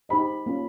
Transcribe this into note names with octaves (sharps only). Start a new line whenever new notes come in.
D#4 G4 C5 D#5 B5
A#3 C#4 F4